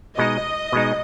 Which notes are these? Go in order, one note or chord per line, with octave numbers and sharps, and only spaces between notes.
B2 G#3 D#4 D#5
B2 G#3 D#4